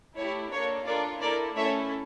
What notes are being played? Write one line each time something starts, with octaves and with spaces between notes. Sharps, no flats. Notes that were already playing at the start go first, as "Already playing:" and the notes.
A3 E4 G4 C#5
A#3 D4 A4 C#5
D4 F4 A4 A#4 D5
A#3 E4 A4 A#4 D5
A3 C#4 E4 A4 C#5 E5